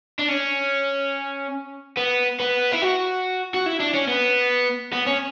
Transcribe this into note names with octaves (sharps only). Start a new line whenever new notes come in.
D4
C#4
B3
B3
E4
F#4
F#4
E4
D4
C#4
B3
B3
C#4